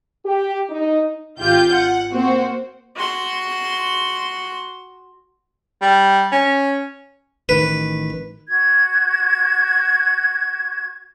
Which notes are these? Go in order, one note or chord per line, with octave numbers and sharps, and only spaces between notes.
G4
D#4
G#1 F4 G4 G6
F#5
A#3 C4 F#4 C5
F#4 C6
G3
C#4
A1 D#3 B4
F#4 G#6